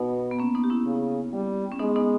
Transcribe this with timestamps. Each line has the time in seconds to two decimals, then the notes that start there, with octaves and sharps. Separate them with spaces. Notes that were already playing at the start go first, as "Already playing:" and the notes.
Already playing: B2 B3 D#4
0.31 B3
0.39 A#3 C#4
0.55 B3 D#4
0.64 G4
0.70 C#4 E4
0.86 C#3
1.33 G3
1.72 C#4
1.79 G#3 B3 D#4
1.96 B3 D#4